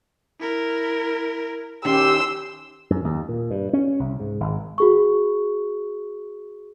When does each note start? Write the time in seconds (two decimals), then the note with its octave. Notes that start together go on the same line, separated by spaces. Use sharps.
0.41 E4 A#4
1.85 D#3 C#4 D#4 G4 C6 E6
2.90 F#2
3.04 D#2
3.29 A#2
3.51 G2
3.73 C#4
4.00 C2
4.20 G#2
4.40 G#1
4.78 F#4 G#4 C#6